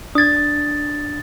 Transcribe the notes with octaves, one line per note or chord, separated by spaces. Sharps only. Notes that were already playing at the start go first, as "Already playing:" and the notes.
D4 D#6 G#6 A6